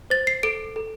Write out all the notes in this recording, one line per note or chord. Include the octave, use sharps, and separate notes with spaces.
C5 A6
C7
A4 D7
A4